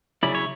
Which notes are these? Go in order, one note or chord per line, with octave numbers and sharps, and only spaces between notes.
C#3 F#3 C#4 E4 D5
C#5